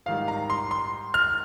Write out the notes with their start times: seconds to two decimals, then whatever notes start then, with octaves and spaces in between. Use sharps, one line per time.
0.06 G#2 D#3 G3 F5
0.28 A#5
0.50 C6
0.71 C6
1.14 F6